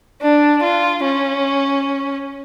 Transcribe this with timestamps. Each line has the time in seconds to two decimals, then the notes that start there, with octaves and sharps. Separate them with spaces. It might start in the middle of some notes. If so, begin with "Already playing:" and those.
0.22 D4
0.63 F4
1.04 C#4